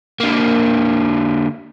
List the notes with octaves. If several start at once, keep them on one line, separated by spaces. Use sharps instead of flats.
D3 A#3